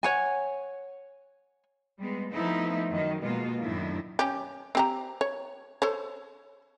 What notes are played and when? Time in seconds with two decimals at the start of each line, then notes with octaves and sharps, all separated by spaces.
0.03 C#5 F#5 G#5
1.99 G3 G#3 B3
2.32 F3 A3 B3 C4 D#4 E4
2.89 F#2 D#3
3.21 B2 G#3 A#3 F4
3.61 F#2 A2 D#3 D4 E4
4.19 C#4 G4
4.75 C4 G4 A#5
5.21 C#5
5.82 A4 C5 C#5